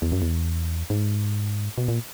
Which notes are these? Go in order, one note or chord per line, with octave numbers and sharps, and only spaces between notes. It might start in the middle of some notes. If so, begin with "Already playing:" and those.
E2
F#2
E2
G#2
B2
A#2